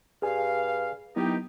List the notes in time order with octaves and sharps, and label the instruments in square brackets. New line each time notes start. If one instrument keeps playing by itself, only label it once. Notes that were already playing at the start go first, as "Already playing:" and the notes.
[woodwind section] G2 F5 [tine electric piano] G#4 G#5
[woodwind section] D#3 D#4 G4 [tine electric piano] F#3 B3 E4